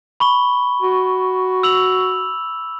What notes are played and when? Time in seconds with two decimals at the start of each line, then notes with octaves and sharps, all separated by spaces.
0.20 B5 C#6 G7
0.82 F#4
1.63 E6 F7 F#7